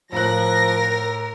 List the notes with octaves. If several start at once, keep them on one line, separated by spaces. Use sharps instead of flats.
A2 F3 A#4 A#5 F#6 A#6